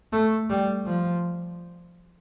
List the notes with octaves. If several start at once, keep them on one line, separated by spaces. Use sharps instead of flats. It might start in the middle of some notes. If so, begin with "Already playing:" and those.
A3
G3
F3